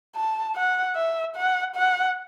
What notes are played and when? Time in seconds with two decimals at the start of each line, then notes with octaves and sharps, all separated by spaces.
0.16 A5
0.55 F#5
0.96 E5
1.36 F#5
1.76 F#5